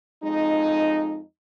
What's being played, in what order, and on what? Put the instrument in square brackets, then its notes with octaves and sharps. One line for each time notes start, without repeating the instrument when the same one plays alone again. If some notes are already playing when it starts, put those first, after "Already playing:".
[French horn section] F2 G#3 D#4